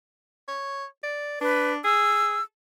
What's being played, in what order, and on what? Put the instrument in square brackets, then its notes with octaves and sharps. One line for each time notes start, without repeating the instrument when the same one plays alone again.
[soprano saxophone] C#5
D5
[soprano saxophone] D4 [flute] B4
[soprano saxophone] G#4 [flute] E6